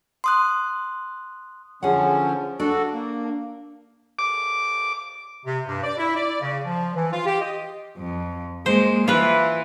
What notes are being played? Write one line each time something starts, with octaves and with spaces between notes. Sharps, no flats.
C6 D#6 F#6
D3 F3 C#4 G#4 F#5
D4 F#4 A4
A#3
D6
C3
G2
D5
E4
D5
C#3
F3
E3
F4
G4
D#5
F2
G#3 A#3 C5
E3 E4 F4 B4